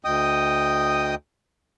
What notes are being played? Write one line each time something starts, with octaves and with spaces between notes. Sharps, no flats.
D2 D#5 G5 D#6